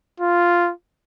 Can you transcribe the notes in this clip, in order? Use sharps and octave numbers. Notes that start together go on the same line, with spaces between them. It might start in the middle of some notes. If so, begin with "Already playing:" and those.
F4